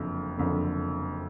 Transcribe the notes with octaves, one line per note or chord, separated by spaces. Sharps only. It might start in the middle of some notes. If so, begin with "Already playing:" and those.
Already playing: F#1 F2 D3
F#1 F2 D3